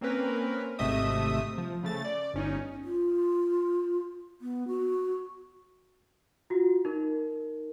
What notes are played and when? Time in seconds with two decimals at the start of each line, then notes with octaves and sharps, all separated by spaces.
0.01 A#3 C4 C#4 A#4 B4
0.79 G#1 C3 A3 D#5 E5 D#6
1.58 F3
1.83 C#3 A3 A6
2.04 D5
2.34 G1 C#4 D#4
2.84 F4
4.41 B3
4.68 F#4
6.50 F4 F#4
6.85 D#4 A#4